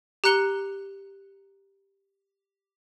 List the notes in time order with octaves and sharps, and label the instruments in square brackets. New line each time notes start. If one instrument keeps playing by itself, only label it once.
[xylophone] G4 A#5 F#6 C#7 G7